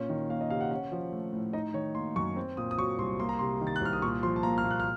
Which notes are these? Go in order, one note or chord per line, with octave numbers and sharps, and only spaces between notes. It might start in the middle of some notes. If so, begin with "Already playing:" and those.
Already playing: A#2 C#4
D#3
A#3 F5
D#5
C3 F5
F#5
C#4 F#5
F3
A3
A2
D#4 D#5
D#3 C#5
A#3 C6
F#2 C#6
C4
A#2 D#6
D#6
F#3 C#6
C2 C6
A#3 C6
A#5
C3 C6
D#3
A6
F#6
C2 F6
D#6
A#2 C#6
F3 C6
A5
A#3 A#5
F6
A#2
F#6
F6